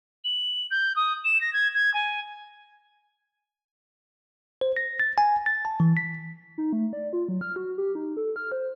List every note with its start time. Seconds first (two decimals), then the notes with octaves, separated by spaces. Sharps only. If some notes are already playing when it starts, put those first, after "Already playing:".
0.24 F#7
0.70 G6
0.96 D#6
1.24 E7
1.41 A#6
1.53 G#6
1.74 G#6
1.93 G#5
4.61 C5
4.76 A#6
5.00 A6
5.18 G#5
5.46 A6
5.65 A5
5.80 E3
5.97 B6
6.58 D#4
6.73 A3
6.93 D5
7.13 F4
7.29 F#3
7.41 F6
7.56 F#4
7.78 G4
7.95 D#4
8.17 A4
8.36 F6
8.52 C5